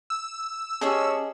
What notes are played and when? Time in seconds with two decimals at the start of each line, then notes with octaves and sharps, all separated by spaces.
0.10 E6
0.81 C#4 G4 G#4 D#5 G#5 A5